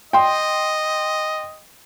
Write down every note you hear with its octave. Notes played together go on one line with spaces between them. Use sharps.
D#5 G5 C6